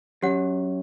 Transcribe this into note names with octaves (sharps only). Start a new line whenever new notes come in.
F#2 G4 C#5 F#5